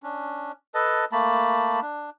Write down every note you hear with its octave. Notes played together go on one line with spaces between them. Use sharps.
C#4 D4
A4 B4 D#5 A5
A3 A#3 A5 B5
D4